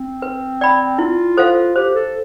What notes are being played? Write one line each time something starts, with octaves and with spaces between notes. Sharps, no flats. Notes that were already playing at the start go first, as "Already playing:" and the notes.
Already playing: C4
B4
D5 G5 B5
E4 F4
A4 C5 F5
G4 C5
A4